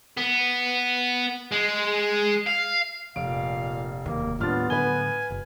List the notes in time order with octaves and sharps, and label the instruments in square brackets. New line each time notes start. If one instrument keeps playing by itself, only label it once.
[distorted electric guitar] B3
G#3
F5
[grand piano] F1 D7 [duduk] A#2 [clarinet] F5
[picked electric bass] E1 D#2 [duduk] A#3
[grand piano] D#1 F6 A6 [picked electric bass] A2 D4 [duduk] B3 [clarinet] F4
[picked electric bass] A2 D3 F#3 [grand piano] B4 G7 [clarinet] G#5
[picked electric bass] F#1